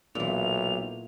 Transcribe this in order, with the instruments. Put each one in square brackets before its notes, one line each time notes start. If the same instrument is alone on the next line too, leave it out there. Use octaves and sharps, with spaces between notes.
[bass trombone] B1 [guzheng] A#2 E3 [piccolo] F7